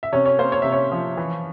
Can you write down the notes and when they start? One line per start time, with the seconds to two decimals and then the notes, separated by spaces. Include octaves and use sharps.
0.03 E5
0.12 C3 C#4 C#5
0.25 C#4 C#5
0.39 A#3 C5
0.52 C#5
0.62 C3 E5
0.72 C#4 C#5
0.92 F3
1.17 E3